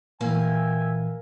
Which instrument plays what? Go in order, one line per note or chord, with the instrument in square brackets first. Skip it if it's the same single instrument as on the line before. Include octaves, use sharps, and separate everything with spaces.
[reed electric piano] A#2 E3 [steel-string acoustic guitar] A#3 [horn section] E5 G5 G#5